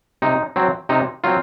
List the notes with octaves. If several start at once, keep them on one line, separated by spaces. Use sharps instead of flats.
C3 D#4
F#3 C4
C3 D#4
F#3 C4 F4